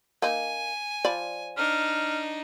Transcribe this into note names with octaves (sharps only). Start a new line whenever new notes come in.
A#3 D#4 G#5
F3 D5 B5
D4 D#4 F6